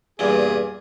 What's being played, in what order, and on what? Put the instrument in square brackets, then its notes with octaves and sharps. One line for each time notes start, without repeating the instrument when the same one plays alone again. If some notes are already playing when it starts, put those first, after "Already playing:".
[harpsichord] E2 G2 A#2 [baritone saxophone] G#4